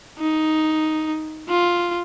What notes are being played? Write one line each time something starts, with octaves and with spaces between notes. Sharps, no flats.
D#4
F4